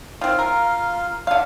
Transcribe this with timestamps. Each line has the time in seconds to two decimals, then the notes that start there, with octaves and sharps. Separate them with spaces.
0.21 D#3 C4 F4 F5
0.39 A#4
1.27 D3 F5